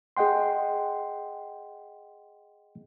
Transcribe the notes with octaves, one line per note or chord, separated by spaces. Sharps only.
G#4 D#5 F#5 G5 C6